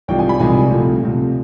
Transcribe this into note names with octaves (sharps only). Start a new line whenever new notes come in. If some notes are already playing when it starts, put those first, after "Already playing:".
C2 C3 F3 G#3 G5
G#5
B5
C2 C3 F3 G#3 G#5
D2 C3 F3
D2 C3 F3